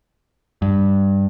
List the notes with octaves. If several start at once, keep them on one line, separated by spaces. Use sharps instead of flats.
G2